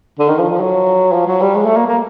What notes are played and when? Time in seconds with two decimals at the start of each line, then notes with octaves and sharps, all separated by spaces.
0.19 D3
0.29 D#3
0.38 F3
0.50 F3
0.60 F#3
1.12 F3
1.27 F#3
1.41 G3
1.55 G#3
1.66 A3
1.76 A#3
1.86 A#3